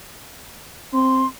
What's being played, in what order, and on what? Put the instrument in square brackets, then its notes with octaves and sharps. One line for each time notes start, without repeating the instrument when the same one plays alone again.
[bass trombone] C4 [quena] C6